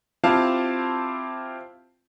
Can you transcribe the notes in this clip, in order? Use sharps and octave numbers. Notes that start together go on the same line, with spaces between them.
C4 E4 F4 G4 F5 A5